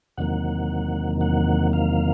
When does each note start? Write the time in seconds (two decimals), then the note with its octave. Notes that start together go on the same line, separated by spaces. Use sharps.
0.18 E2 C3 D#3 F#3 A#3 F#5
1.21 F#5
1.73 F5